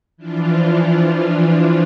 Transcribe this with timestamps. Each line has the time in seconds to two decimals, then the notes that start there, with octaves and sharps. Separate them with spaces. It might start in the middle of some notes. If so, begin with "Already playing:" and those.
0.17 E3 F3 D4 F4